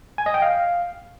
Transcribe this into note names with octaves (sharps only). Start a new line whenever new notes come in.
G#5
D#5
G5
F5